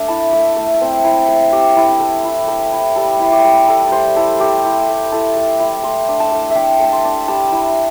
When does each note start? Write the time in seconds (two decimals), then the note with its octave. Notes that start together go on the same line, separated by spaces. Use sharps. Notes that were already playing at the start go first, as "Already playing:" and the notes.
Already playing: A3 D4
0.08 E4 A5
0.33 A3
0.57 A3
0.81 C4
1.04 E4
1.28 A3
1.52 A3 G4
1.77 E4
2.00 A3
2.25 E4
2.48 A3
2.73 E4
2.96 G3 A4
3.20 E4
3.32 G4
3.45 G3
3.68 E4 A4
3.85 D5
3.92 G3 C5
4.16 E4 A4
4.40 A3 G4
4.65 E4
4.88 A3
5.12 E4 A4
5.37 A3
5.60 E4
5.84 A3 C6
6.09 D4
6.20 A5
6.32 A3
6.50 E5
6.56 D4 G5
6.80 A3 A5
6.92 C6
7.05 D4
7.28 G3 A5
7.52 E4